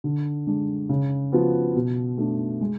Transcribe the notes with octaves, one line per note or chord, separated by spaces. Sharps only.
D3
G#3 D4
C#3
F3 B3 F#4
B2
A3 D4
G#3